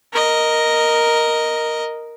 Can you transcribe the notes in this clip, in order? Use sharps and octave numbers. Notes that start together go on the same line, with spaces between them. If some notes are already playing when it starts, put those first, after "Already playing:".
A#4 D#5